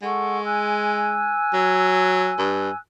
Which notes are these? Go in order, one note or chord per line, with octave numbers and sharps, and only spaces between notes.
G#3 A4 F#5 C#6
G#5 E6 F#6
F#3
G2